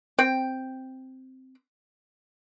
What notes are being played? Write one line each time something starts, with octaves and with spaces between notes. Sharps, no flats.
C4 G5